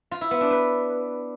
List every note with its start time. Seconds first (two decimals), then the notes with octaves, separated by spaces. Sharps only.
0.11 F4
0.21 E4
0.31 B3
0.41 D4
0.51 B4